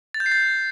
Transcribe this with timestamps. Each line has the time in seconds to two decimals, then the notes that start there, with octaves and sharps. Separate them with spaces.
0.14 A6
0.20 G6
0.26 C7
0.32 A6